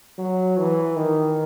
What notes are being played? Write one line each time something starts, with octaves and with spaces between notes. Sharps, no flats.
F#3
E3
D#3